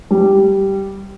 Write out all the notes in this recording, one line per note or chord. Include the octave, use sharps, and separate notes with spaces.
G3